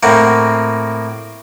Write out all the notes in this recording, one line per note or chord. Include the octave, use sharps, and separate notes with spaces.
A2 A#3 C4 F#5